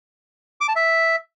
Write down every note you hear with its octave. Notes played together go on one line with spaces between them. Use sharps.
D6
A5
E5